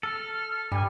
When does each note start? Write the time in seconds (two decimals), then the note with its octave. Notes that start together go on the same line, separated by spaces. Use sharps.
0.03 A4 F6
0.72 G2 G3 G#5